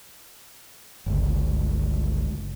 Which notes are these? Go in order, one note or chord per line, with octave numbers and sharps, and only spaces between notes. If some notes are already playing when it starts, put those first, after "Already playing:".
G1 C#2